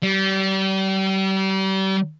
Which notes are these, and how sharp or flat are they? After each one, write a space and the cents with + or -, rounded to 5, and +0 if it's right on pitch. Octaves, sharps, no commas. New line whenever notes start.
G3 -35